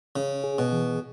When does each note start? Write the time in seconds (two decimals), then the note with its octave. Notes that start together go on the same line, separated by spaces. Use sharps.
0.16 C#3 C#4
0.44 G#4
0.58 B2
0.72 E3